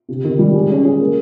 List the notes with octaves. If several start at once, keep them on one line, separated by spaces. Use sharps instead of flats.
C3
D#3
G3
G#3
C#4
G#4
A#3